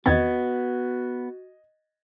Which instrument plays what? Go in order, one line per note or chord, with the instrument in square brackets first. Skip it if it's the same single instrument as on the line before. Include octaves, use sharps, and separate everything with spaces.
[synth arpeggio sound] E2 D#3 C4 [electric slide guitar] B3 [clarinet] F#4 [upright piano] D#5 G#6 A6